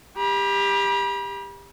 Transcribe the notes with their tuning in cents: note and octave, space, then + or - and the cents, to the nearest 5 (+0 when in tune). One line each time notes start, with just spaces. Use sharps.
G4 +25 B5 -35